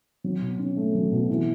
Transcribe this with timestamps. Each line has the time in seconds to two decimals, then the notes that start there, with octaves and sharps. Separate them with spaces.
0.24 F#3
0.42 B2
0.59 C#4
0.77 A3
0.95 F#3
1.12 B2
1.30 E3